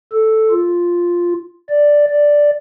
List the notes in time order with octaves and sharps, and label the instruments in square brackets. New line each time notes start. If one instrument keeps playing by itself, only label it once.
[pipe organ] A4
F4
D5
D5